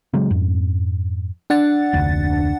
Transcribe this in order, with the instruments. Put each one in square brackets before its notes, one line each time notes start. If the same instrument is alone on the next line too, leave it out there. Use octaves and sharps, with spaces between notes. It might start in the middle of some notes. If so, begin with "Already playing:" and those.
[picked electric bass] C#3 F#3 G#3
F2 G#2
[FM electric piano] D4 F#5 A6
[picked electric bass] F1 D2